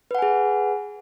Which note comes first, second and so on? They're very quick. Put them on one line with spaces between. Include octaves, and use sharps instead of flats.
B4 F#5 G#5 G#4